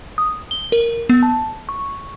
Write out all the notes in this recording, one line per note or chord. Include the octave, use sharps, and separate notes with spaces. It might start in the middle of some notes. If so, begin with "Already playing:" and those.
D#6
G7
A#4
B3
A5
C#6